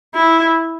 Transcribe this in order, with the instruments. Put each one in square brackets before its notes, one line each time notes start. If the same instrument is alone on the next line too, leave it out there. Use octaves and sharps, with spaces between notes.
[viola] E4